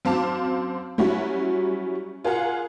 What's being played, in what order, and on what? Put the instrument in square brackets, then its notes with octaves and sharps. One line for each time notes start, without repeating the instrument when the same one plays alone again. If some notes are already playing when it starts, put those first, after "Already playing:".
[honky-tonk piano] F#2 C4 F5 A5 D6
F#3 G3 C#4 E4 F#4
F4 G#4 A#4 F5 F#5